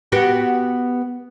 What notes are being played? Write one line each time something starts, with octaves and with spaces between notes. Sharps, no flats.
B3 F#4 G4